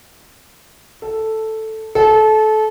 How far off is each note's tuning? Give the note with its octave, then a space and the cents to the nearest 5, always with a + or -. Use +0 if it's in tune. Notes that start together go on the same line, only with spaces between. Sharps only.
A4 +0
A4 -25